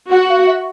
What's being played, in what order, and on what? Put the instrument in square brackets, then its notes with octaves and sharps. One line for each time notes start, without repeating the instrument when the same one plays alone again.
[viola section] F#4 [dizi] F#5
[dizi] F5
E5